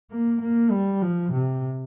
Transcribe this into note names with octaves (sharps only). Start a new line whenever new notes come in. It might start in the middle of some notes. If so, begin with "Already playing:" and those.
A#3
A#3
G3
F3
C3